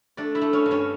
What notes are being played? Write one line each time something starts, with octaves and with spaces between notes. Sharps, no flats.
A3 D4 D5
E4 E5
A3
C#4 C#5
G2
C#4 C#5